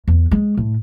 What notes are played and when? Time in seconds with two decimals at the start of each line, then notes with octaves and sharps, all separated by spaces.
0.08 E2
0.31 G#3
0.57 A2